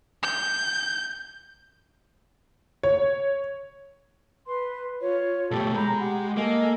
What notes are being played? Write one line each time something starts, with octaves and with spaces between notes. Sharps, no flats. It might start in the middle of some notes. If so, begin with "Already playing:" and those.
G6
C#5
B4 C6
F4 C#5
B2 A3 G4 A4
G#3 A#5 B5 G6
G4 F#5
A#3 A4 D#5 G#5